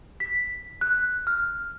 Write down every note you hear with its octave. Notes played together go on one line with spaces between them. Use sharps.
B6
F#6
F6